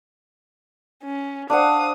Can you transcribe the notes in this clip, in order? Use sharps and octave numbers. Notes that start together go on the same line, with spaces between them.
C#4
D4 C5 F5 F#5 D#6